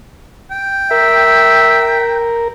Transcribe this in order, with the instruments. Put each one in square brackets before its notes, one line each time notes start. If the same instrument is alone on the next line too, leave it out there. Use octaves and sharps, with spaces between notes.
[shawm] G5
[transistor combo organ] A#4 [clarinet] E5